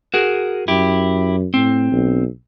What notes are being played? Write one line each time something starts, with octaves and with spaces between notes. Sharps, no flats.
F#4 G#4 A#4
F#2 E4 G4
A2 C4
B1